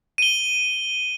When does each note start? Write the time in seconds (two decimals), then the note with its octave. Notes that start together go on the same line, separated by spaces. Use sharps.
0.18 D#7 G7